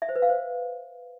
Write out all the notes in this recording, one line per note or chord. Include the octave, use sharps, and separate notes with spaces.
E5
C5
B4
F5
C5